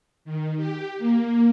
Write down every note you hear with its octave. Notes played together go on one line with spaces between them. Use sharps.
D#3
G4
A#3